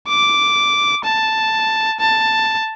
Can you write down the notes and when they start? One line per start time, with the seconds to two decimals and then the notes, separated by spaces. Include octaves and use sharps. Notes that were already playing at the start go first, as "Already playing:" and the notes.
0.09 D6
1.05 A5
2.00 A5